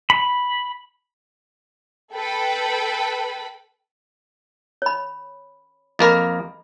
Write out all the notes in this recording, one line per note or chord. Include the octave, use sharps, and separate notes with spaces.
B5
A4 B4 G5 B5
C#5 B5
F2 A#3 A#4 D#5 B5